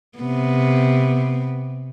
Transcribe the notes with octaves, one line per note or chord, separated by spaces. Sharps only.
C3 B3